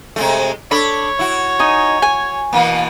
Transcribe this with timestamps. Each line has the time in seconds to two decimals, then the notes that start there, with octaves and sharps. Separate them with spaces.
0.16 C3 G#3 A3
0.71 D4 A4 C#5 B5
1.19 E4 F#4
1.59 D#4 D#5 G#5
2.02 G#5
2.53 B2 E3 A#3